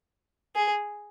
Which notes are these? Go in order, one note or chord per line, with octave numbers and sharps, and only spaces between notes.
G#4